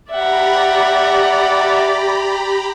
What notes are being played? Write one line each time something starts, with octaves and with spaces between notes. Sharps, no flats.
G4 D5 E5 F#5 A#5 B5